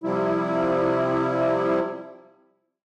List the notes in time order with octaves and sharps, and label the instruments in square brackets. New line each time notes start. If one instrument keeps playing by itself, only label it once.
[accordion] C3 F3 G3 E4